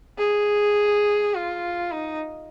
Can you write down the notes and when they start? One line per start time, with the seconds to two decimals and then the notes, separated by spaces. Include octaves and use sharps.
0.18 G#4
1.34 F4
1.92 D#4